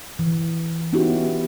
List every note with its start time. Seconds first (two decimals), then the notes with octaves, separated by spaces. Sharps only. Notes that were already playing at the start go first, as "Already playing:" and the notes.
0.19 E3
0.93 B3 C#4 D#4 E4 F#4 G4